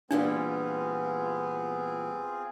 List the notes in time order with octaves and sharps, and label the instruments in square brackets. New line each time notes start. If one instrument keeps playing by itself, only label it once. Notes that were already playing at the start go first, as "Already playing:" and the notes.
[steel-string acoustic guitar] A#2 E3 G3 [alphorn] B3 [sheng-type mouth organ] C4 F4 G#4 [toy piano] D4